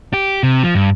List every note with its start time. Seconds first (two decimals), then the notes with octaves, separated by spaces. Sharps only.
0.13 G4
0.43 C3
0.63 F3
0.75 G2